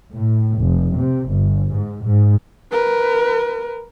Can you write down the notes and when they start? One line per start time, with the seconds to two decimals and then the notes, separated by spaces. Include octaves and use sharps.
0.14 A2
0.58 F1
0.96 C3
1.29 G1
1.72 G#2
2.04 G#2
2.72 A#4 B4